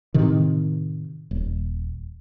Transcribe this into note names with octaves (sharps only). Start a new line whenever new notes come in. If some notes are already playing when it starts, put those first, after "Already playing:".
A2 C3 D#3
D#1